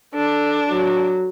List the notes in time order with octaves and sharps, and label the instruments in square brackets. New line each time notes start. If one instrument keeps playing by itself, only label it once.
[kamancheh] D4 [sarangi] A4
[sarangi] F#3